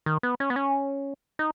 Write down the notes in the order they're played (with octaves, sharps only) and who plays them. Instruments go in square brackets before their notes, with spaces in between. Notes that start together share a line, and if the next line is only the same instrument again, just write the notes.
[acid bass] D#3
B3
C#4
B3
C#4
D#4